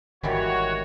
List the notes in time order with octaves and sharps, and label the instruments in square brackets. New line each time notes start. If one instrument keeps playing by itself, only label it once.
[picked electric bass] G#1 [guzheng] D#3 E3 G3 [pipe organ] F#4 C#5